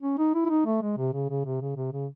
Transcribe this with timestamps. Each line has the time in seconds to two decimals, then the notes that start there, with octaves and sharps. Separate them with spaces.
0.02 C#4
0.18 D#4
0.35 E4
0.46 E4
0.50 D#4
0.66 A3
0.82 G#3
0.98 C3
1.13 C#3
1.30 C#3
1.45 C3
1.61 C#3
1.77 C3
1.93 C#3